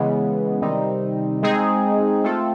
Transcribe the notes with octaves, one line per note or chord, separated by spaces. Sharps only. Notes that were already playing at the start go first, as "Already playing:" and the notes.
Already playing: C#3 E3 G#3 B3
C3 D#3 G3 C4 D#4
G#3 C4 D#4 G#4
A3 C4 F4 A4